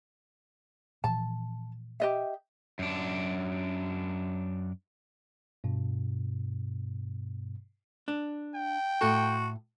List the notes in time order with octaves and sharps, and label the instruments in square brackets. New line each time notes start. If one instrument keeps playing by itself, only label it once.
[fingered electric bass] A#2 E3 F3 [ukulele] A5
[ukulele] G4 D#5 E5
[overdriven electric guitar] F#2 D4
[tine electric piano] G2 B2
[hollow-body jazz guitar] D4
[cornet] G5
[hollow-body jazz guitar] A2 A4 [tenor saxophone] F#4